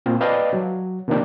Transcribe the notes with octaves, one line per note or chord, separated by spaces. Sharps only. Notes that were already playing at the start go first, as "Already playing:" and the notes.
A#2 C4 F4 C5
B4 D5 D#5 F5 G5 A5
F#3
C3 D#3 F3 A#3 D4 G4